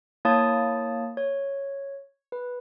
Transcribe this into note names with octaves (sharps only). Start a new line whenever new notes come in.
A#3 E4 C#5 A5 D#6 A6
C#5
B4